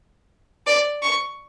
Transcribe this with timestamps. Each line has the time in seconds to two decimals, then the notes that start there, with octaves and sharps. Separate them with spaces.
0.67 D5
1.02 C#6